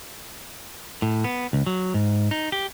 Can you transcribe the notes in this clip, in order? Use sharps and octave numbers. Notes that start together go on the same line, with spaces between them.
A2
B3
C#2
F#3
G#2
D#4
G4